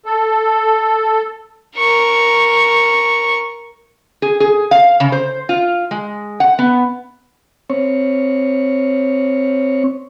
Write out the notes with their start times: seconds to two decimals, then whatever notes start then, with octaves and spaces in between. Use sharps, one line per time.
0.06 A4
1.77 A#4 C#6
4.22 G#4
4.40 G#4
4.71 F5
5.00 C#3
5.12 C5
5.49 F4
5.91 G#3
6.40 F#5
6.59 B3
7.70 C4 C#5